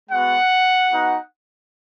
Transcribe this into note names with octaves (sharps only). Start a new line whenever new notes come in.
G#3 B3 F#4 F#5
B3 D#4 F#4